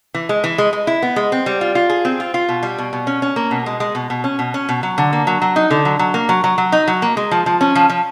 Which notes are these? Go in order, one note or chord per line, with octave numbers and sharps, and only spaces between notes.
E3
G#3
E3
G#3
G#3
E4
B3
G#3
C4
G3
F4
F4
G#4
C4
F4
F4
B2
G3
B2
B2
C#4
C#4
A#3
B2
G#3
G#3
B2
B2
C#4
B2
C#4
B2
F#3
D3
A#3
F#3
F#3
D#4
D3
F#3
F#3
A#3
F#3
F#3
F#3
D#4
F#3
A#3
G#3
F3
F3
C#4
F3
F3